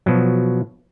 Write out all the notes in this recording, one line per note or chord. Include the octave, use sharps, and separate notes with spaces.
B2 F3 F#3